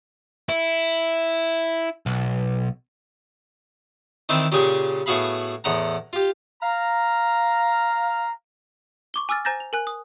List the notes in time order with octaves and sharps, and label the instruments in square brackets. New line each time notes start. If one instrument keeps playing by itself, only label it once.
[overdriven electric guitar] E4
B1
[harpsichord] D#3 E3 C4 B4 D5
A#2 C#3 G4 G#4 G#5 D6
A2 B3 F#4 G#4 F5 B5
E2 A2 D#5 F#5 A#5
F4 G4
[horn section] F5 A#5
[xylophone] C#6 D6 G7
G#5 D6 E6 F6 A6
C5 G#5 A#5 G6 A6 A#6
F7
A#4 G#5 F#6
D#6